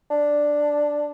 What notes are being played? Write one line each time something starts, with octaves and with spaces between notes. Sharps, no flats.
D4